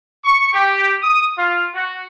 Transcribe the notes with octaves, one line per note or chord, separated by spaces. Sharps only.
C#6
G4
D#6
F4
F#4